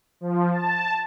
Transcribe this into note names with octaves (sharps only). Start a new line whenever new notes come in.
F3
A5